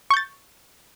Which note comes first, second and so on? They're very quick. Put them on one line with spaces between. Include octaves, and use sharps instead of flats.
C#6 G6 A6